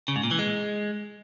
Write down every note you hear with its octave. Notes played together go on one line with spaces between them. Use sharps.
C#3
G#2
A#2
E3
G#3